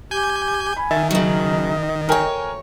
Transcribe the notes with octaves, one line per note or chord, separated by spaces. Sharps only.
G4 G#5 G6
G#5 B5
D#3 E5 A6
C#3 F#3 D#5
D2 A#4 C#5 G5 G#5